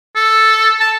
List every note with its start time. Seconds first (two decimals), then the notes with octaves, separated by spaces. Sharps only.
0.16 A4
0.80 A5